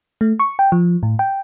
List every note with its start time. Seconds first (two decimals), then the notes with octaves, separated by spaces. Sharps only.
0.21 A3
0.40 C#6
0.59 G5
0.72 F3
1.03 A2
1.19 G5